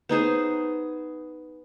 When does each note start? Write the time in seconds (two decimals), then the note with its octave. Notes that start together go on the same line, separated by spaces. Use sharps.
0.09 B3 D#4 G#4 C5